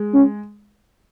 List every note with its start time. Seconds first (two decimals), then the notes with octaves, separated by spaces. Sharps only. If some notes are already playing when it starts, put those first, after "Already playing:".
Already playing: G#3
0.14 C#4